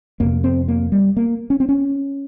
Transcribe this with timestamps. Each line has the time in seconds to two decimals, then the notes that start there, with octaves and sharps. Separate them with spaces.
0.20 F2 C3 A#3
0.44 C4
0.68 A#3
0.92 G3
1.17 A#3
1.50 C#4
1.60 C4
1.69 C#4